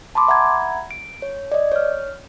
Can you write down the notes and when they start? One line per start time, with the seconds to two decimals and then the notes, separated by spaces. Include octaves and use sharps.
0.15 A5 B5 C6 D6
0.28 E5 F#5 A#5 B5 G#6
0.91 D7
1.22 C#5
1.52 D5 D#5
1.72 C#5 F6